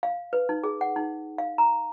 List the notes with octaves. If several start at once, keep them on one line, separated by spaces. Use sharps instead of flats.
F5
B4
D#4
G#4
F#5
D#4
F5
A#5